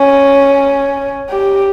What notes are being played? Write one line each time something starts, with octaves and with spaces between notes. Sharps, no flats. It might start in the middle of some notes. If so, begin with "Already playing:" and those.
Already playing: C#4
G4